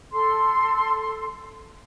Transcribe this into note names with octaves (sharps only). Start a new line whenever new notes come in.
A4 C6